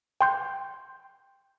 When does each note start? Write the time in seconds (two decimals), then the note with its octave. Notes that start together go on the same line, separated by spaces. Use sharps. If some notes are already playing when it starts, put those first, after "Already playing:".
0.21 G5 C6 G6